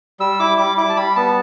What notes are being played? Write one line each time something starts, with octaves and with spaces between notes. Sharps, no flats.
G3 E6
E4 D6
G3 D6
E4 D6
A5
G3 B5
B3 A5